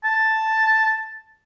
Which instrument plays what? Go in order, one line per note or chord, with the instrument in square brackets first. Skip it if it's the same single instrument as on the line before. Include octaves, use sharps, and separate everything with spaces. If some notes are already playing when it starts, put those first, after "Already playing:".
[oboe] A5